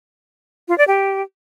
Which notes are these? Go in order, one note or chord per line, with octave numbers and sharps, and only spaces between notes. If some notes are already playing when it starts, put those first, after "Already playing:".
F4
D5
G4